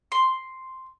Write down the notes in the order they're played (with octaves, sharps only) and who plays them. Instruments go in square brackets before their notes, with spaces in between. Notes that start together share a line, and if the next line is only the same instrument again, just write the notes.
[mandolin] C6